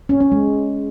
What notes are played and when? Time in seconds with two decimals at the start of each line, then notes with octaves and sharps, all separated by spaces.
0.09 C#4
0.20 C#4
0.32 G#3